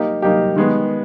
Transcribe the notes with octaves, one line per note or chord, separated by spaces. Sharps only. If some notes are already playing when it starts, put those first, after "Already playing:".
Already playing: A#3 D#4 G4
A#3 D#4 G4
D#3 G#3 B3